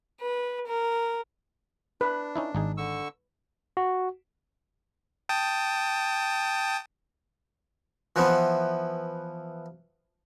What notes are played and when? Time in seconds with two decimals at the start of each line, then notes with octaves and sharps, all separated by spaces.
0.22 B4
0.68 A#4
2.01 D4 B4
2.36 C#4 D#4 E4
2.55 G#1 D#4 G#4
2.77 D3 C#6 E6
3.77 F#4
5.29 G5 A5 D#6
8.16 E3 F3 B3